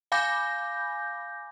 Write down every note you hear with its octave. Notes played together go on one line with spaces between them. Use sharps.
F5 G#5 B5 D6 G6 A#6